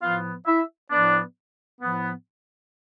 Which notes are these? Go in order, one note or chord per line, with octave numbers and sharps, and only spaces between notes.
A2 F3 B3 F4 F5
E4 E5
A2 F3 B3 D4 D5
A2 F3 B3